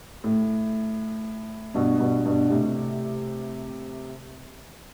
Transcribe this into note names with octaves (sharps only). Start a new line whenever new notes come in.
A2
G2 B2
G2 B2
G2 B2
A2 C3